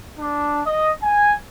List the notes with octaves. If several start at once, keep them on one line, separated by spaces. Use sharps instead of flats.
D4
D#5
G#5